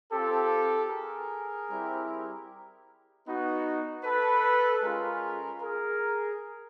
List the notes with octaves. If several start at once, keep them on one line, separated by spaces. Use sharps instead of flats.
C4 F4 G4 A4
G#4 A#4
G3 C4 E4 G4
B3 D#4 F#4
A4 B4
G#3 C#4 F4 G#4 A#4
G#4 A#4